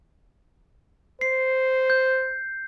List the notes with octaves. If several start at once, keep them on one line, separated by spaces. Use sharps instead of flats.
C5 C7
G6